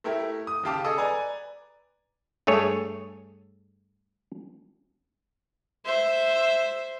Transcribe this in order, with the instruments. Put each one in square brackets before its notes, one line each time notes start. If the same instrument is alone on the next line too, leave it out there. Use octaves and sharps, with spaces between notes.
[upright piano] A3 E4 G4 A#4 E5
D#6
D#2 C#3 G4 F5 A5 D6
G#4 A4 D#5 D#6 E6
B4 D5 G#5 A#5
[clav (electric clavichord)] G2 A3 G#4 C#5
[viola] C5 E5